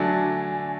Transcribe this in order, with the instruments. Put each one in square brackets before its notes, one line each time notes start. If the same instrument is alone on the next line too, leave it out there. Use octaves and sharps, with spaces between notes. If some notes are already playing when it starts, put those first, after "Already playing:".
Already playing: [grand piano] D3 F#3 A3 D4 [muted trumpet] G#5